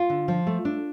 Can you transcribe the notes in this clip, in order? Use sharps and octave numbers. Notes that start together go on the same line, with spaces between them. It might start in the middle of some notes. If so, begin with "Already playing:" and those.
Already playing: F4
D3
F3
A3
D4